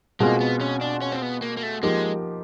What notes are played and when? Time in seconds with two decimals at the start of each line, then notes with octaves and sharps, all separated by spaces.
0.20 B2 G#3 A#3 C4 F4 G#4
0.41 B3
0.61 C#4
0.81 D4
1.02 C#4
1.12 C4
1.22 B3
1.42 A#3
1.57 A#3
1.63 A3
1.83 F3 G#3 A#3 D#4 G4